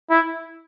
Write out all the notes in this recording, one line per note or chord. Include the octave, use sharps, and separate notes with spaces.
E4